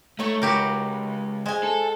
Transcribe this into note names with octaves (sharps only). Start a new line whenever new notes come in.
A3 D#4 C#5 C#6
C#2 F#4 G4 A#4
G#3 C5 G#5
A4